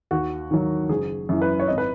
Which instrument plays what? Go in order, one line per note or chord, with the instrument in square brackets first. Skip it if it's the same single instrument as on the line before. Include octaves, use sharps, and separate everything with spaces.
[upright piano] D#2 F#4
D#3 F#3
F#1 G#4
F#2 E3
B4
C#5
G#1 D#5
B4